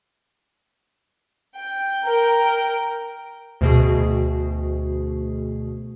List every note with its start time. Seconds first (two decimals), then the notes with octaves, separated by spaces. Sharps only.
1.55 G5
2.04 A#4 G5
3.61 D2 B2 G#4